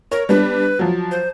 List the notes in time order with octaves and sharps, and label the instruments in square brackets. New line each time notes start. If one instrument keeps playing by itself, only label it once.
[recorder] A#4 [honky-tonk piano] C#5
[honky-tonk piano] G3 B3 D4 [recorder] B4
[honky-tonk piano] F3 F#3
[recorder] C5